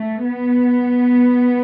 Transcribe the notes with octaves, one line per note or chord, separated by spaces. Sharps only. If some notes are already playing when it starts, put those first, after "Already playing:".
Already playing: A3
B3